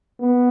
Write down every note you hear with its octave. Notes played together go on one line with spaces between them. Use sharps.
B3